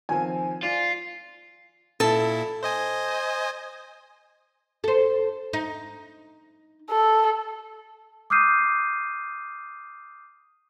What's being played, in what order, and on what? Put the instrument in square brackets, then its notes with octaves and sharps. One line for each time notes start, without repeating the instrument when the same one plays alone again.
[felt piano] D#3 F3 C4 [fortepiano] G#5
[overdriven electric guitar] F4 [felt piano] D5
[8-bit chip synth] A#2 E4 [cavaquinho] A4 A5
[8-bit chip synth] C5 D#5 G#5
[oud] A4 C5
D#4
[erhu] A4
[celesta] D6 D#6 F6 G6 C7 D#7